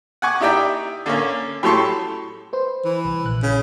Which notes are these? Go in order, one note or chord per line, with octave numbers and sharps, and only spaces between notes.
F#5 G#5 C#6 D6
D#4 E4 G4 D5 G5 A#5
D3 A#3 C#4
A2 F#3 G4 A4 C6 C#6
B4 C5
E3
C2
A#1 F#6
C#3